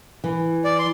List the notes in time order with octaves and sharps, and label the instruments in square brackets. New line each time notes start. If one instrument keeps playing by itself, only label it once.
[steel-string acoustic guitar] E3
[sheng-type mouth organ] D5
C6